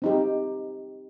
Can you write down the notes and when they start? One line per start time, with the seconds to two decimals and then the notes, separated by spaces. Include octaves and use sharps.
0.02 C4 D#4 G4